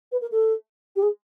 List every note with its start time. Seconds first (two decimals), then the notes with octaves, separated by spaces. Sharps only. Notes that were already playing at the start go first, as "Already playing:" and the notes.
0.12 B4
0.21 A#4
0.32 A4
0.96 G4
1.02 G#4